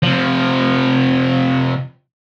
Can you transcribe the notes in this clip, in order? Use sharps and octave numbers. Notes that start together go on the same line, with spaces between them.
C3 F3